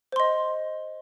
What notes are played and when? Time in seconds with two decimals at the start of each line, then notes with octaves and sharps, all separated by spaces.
0.12 C5
0.16 C6
0.20 D#5